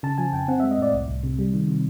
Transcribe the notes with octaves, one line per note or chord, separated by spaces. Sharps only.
C#3 A5
F3 G#5
F2 G5
C4 F#5
G#3 E5
D#5
A2 D5
C2
C2
C3
G3
D#3
C3